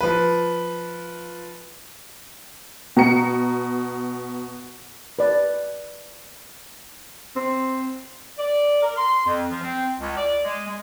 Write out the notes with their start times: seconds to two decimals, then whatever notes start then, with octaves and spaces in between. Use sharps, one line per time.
0.01 F3 B4
2.96 B2 A#5 C#7
5.19 B4 D5
7.36 C4
8.38 D5
8.82 A#4
8.97 C6
9.26 F2
9.51 F3
9.63 C4
10.00 C#2
10.17 D5
10.44 G#3
10.66 G#3